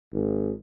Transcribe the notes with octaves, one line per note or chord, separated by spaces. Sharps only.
G#1